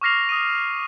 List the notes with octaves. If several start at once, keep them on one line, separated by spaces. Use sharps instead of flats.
C#6 D6 F6 A#6 C7 F7
D#6 D#7